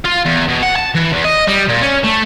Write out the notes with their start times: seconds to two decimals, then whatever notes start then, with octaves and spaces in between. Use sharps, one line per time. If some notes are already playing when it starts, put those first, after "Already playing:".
0.05 F4
0.25 E2
0.48 B2
0.63 F#5
0.76 A5
0.95 E3
1.13 E2
1.25 D#5
1.48 G3
1.69 A#2
1.82 C#4
2.04 A3